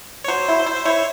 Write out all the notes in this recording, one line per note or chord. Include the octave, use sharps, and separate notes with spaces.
C#5
F#3 C5
E4
E4
E4 C#5